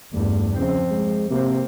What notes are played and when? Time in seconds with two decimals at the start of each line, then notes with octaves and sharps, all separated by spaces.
0.13 E2 G2 A3
0.56 C#3 F3 C4
0.91 G#3
1.31 C3 A#3 C4